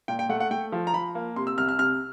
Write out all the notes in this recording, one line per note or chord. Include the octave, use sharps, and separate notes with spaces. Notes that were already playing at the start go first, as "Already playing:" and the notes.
A#2 G5
G5
A3 F#5
F#5
A3 G5
F3
A#5
F3 B5
A#3
C3 C6
E6
C2 F6
F6
C3 F6